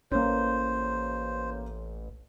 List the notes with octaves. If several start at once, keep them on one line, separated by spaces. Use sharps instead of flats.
A1 A#3 C#4 C5